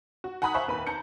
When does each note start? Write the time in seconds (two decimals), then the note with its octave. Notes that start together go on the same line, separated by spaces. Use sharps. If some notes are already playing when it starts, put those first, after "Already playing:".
0.24 F#4
0.42 F#5 G#5 A#5 B5 D#6 F#6
0.54 C5 E5 F5 G#5 B5 C#6
0.68 D#2 B4 B5
0.87 A5 A#5 G6 C#7